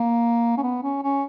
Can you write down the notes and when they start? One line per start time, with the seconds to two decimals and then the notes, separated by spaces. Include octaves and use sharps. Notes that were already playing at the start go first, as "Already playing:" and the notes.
Already playing: A#3
0.58 C#4
0.63 B3
0.83 C#4
1.03 C#4